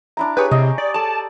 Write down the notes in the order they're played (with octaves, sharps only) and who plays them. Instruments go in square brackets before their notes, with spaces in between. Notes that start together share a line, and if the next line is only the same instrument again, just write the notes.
[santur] D4 E4 A#5
[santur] G4 G#4 C#5 [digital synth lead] B4
[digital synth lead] C3 [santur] D#5
[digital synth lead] D5
[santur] A4 D5 [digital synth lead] A5